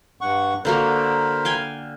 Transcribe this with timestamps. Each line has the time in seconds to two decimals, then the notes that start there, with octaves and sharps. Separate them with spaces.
0.21 G2 F#5 C#6
0.65 D3 A#3 F#4 A#4 C5 B5
1.45 F5 G5 G#5